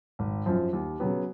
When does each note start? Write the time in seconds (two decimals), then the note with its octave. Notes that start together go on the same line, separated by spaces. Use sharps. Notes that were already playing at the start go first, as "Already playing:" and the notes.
0.19 G#1
0.46 F#2 F3
0.73 D#2
1.00 C#3 F#3 B3